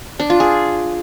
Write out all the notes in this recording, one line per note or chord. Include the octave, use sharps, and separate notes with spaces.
D4
F4
G#4